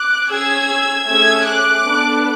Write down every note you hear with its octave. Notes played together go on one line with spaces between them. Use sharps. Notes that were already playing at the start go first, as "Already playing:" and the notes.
Already playing: D6 F#6
C#4 G#4 E6 G#6
A3 C#4 G#4 E6 G#6
D6 F#6
B3 D4 A4